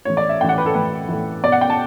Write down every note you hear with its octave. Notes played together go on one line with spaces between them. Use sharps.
A2 E3 C#5
D5
E5
A2 E3 F#5 G5
B4
A4
A2 E3 B4
A2 E3
B2 D5
F#5
G5
A5